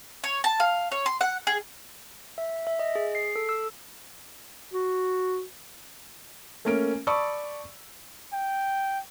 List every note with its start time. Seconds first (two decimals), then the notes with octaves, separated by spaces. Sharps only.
0.24 C#5
0.44 A5
0.60 F5
0.92 C#5
1.06 C6
1.21 F#5
1.47 G#4
2.38 E5
2.67 E5
2.79 D#5
2.95 G#4
3.15 C7
3.36 A4
3.49 E6
4.72 F#4
6.65 A3 A#3 C#4 A#4 D7
7.07 D5 A5 B5 C#6 D#6 E6
8.33 G5